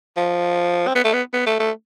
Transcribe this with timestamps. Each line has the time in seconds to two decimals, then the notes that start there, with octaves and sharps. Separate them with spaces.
0.17 F3
0.87 C4
0.95 B3
1.04 A3
1.13 B3
1.33 B3
1.46 A3
1.60 A3